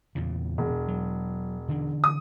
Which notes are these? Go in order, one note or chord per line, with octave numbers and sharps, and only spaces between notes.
E2 A#2 C#3
E1
F#3
D3 E3 D4
D#6